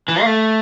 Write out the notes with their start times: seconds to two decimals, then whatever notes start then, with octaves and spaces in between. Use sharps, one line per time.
0.08 E3
0.21 A#3
0.26 A3